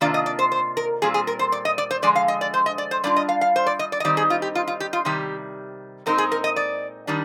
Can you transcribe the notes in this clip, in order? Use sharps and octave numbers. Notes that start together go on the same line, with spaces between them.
C3 D#3 A#3 D4 F4 D5
D#5
D5
C5
C5
A#4
A#2 G3 C4 F4 G#4
G#4
A#4
C5
D5
D#5
D5
C5
D3 F3 G#3 D5
F5
D#5
D5
C5
D#5
D5
C5
G3 D4 F4 D5
D#5
F5
F5
C5
D5
D#5
D5
D#5
D#3 G3 C4 D#4 D5
G#4
F4
G4
F4
F4
G4
F4
C3 D#3 G3 G4
A#2 G#3 C4 D#4 A#4
G#4
A#4
D#5
D5
D#3 G3 D4